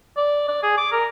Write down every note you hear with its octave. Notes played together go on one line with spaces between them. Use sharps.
D5
D5
G#4
D6
A#4